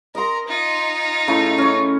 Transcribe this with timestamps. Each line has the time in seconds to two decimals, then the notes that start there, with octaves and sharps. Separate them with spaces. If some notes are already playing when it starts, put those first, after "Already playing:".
0.15 A#4 D#5 A#5 C6
0.48 D#4 F4
1.28 C#3 A3 E4
1.58 C#4 C#5